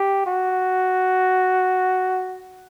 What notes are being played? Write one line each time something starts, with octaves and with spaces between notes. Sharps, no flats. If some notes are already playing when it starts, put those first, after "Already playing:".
Already playing: G4
F#4